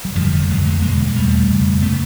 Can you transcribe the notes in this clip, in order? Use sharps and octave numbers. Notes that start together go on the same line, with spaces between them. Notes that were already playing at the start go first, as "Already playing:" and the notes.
F#3
F2 D3 F3 G3
F3 G3
A3
F2 D3 F#3 G#3
G#3 A#3
E2 B2 G#3 A#3
A#3
E2 B2 G3 A3
F2 C#3
C#3 A3 B3